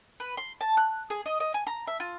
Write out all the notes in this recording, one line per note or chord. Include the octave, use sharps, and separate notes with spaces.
B4
C6
A5
F#6
G#4
D#5
D#5
G#5
A#5
E5
F4